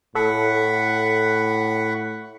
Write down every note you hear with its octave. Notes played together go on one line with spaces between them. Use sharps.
A2 A4 F#5 B5 C#6